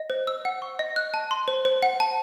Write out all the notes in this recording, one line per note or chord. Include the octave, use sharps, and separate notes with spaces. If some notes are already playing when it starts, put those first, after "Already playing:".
Already playing: D#5
C5
E6
F#5
C#6
D#5
F#6
A5
C6
C5
C5
F#5
A5